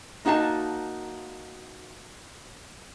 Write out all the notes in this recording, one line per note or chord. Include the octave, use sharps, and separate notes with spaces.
A#3 D#4 F#4 E5 A5